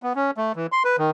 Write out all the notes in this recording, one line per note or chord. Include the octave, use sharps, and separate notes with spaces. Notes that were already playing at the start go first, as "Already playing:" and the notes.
B3
C#4
A3
E3
C6
B4
D#3